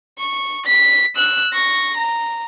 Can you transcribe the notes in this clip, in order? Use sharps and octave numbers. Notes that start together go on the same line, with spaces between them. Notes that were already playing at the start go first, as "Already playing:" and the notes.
C#6
B6
E6 F#6
C#6 A#6
A#5